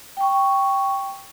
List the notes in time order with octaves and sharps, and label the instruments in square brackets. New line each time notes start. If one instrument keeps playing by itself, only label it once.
[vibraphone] G5 C#6